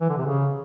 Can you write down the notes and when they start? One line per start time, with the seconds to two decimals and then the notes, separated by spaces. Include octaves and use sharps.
0.01 E3
0.09 D3
0.18 C3
0.26 C#3